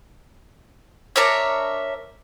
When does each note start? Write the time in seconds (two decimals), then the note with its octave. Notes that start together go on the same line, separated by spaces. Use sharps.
1.16 D4 A#4 C#5 E5